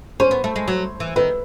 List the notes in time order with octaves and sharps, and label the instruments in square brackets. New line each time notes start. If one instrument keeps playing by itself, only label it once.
[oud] C#4 [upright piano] C5
[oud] B3
A3
G#3
F#3
E3
[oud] D#3 [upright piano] B4